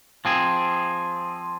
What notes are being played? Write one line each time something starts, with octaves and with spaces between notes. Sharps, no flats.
F3 C4 G#4